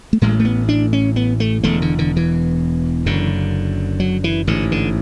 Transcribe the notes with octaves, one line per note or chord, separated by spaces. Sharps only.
A3
A1 A2 G#3
A3
B3
D4
C#4
B3
A3
E1 E2 D3 A3
D3
D3
E3
F#1 F#2 D3
F#3
E3
A1 G#2 D3
D3